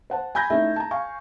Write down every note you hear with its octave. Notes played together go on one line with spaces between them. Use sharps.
C5 F#5 A5
G#5 B5 G6 G#6 A#6
A3 C#4 D#4 E4 E5
A5 A#5
F5 G#5 C#6